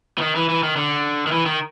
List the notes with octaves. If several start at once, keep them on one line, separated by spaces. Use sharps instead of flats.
E3
D#3
E3
E3
D#3
D3
D#3
E3
D#3